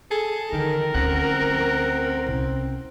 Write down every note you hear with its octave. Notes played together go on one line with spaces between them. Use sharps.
G#4 A4
D3 D#3 A#4
D2 C4 C#4 F#5
C2 C#4